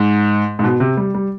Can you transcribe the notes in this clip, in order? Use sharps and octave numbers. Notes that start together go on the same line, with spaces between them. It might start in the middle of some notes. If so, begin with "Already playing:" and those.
Already playing: G#2
G#2
B2
C3
G3
G3